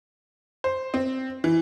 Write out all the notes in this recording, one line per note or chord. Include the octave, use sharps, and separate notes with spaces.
C5
C4
E3